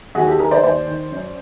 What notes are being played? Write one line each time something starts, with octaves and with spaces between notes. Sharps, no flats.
D#2 F#4 G#4
G4 A4
D#3 G#4 A#4
C5 D5
D#2 C5 D5
D#3
F#2